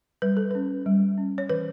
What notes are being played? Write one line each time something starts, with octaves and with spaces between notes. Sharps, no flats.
G3 B4
A4
C#4 B4
G3
C#4
C#5
E3 B4